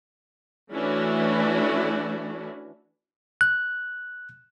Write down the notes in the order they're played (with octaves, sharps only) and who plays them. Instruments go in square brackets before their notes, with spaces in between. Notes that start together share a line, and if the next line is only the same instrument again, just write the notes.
[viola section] E3 A3 C#4 D4 E4 F#4
[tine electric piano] F#6